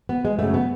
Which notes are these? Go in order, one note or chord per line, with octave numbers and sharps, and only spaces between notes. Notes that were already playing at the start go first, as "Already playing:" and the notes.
B3
G#3
F#2 C#3 A3
B3